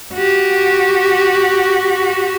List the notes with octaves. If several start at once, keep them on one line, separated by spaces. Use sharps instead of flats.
F#4 G4